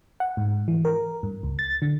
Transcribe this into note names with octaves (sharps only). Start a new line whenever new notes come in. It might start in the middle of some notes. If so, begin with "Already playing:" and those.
F#5
G#2
E3
A#4
G2
C#2
A6
D3